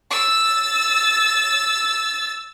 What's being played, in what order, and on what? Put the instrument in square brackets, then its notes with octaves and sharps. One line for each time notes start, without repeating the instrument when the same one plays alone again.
[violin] E6 A6